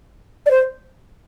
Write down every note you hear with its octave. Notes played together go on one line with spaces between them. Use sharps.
D5
C5